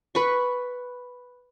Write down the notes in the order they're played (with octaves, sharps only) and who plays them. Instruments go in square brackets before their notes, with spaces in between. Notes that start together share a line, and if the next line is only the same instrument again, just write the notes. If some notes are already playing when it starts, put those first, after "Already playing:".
[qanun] B4 B5 C#6